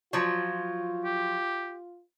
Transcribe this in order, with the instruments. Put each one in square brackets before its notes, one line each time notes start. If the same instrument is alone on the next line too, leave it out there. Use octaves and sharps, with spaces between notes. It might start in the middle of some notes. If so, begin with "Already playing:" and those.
[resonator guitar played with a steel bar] F3 F#3 [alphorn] F4
[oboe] G4